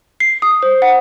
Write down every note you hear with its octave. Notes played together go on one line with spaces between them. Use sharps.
C7
D#6
C5
F#5